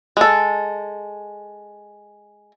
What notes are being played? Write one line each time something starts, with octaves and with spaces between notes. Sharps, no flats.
G#3 A4